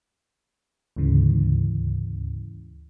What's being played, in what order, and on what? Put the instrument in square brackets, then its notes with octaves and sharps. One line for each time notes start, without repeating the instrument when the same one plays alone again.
[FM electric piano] D2 G#2 C#3 E3